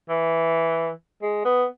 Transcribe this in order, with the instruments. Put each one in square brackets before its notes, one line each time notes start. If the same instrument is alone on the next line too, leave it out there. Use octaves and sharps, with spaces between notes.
[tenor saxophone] E3
G#3
B3